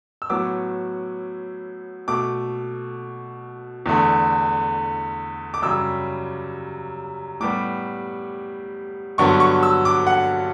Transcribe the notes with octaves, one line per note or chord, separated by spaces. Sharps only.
E6
A2 F#3 B3 D6
B2 A3 D6
E2 D3 A3
D6
F#2 C#3 G3 E6
A2 G3 B3 D6
G2 D3 F#3 B3 C#6
C#6
E6
D6
F#5